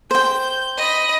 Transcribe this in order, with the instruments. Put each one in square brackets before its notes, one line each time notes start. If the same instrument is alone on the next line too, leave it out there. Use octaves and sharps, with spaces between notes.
[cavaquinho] C5 G5 [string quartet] G6
[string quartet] D#5 B5